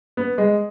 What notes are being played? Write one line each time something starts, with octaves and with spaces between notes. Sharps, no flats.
B3
G#3